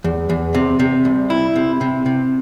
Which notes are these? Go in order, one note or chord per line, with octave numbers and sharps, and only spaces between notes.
E2
E2
C3
C3
C2
E4
C3
C3
C3